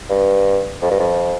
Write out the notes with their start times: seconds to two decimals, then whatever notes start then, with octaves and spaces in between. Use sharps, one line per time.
0.09 G2
0.82 F2
0.91 G2
0.99 F2